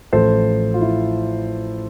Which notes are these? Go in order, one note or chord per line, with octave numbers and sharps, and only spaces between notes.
A1 A2 F3 A4 C5
F4
E4